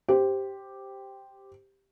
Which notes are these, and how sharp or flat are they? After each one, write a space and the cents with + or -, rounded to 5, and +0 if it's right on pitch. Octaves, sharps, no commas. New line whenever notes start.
G4 +0 C5 +0